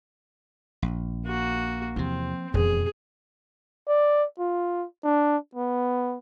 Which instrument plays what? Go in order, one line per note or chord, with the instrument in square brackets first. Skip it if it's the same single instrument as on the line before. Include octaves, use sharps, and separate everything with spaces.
[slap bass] A#1
[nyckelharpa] A#3 F#4
[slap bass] E2 C3 [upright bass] F3 [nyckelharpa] C4
[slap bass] E1 [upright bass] F2 B2 [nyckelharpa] G#4
[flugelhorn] D5
F4
D4
B3